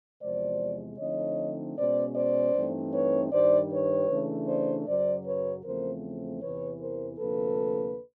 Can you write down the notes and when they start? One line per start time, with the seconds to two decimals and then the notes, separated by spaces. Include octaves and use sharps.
0.21 E2 C3 F3 G#3 C5 D5
0.98 D3 F3 A3 C4 D#4 C#5 D#5
1.76 B2 G#3 C#4 C5 D5
2.15 C5 D5
2.53 G2 E3 A3 C4 D#4
2.92 B4 C#5
3.31 G2 D#3 G3 C5 D5
3.70 B4 C#5
4.09 C#3 E3 A3 D4
4.47 C5 D5
4.87 F#2 C#3 F#3 C5 D5
5.25 B4 C#5
5.64 E2 C#3 F3 A3 C4 A#4 C5
6.42 E2 C3 E3 B4 C#5
6.80 A#4 C5
7.19 D2 C3 F3 A#3 D4 A4 B4